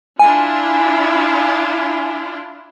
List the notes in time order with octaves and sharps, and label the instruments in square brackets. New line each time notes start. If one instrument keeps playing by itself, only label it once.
[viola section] D4 E4 F4 [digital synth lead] G#5